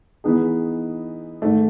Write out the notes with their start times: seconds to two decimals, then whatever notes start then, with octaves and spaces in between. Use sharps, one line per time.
0.24 E3 B3 D#4 G#4
1.42 G#2 D#3 A3